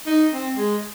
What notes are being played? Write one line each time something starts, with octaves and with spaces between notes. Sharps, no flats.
D#4
C4
G#3